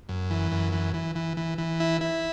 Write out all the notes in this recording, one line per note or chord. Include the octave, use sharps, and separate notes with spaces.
F#2
E3
F#2
E3
E3
E3
E3
E3
E4
E4